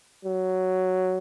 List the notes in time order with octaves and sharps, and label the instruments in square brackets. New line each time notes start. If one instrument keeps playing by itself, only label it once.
[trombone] F#3